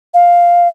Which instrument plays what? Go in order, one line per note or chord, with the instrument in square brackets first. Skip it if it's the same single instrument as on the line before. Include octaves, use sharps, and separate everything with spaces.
[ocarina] F5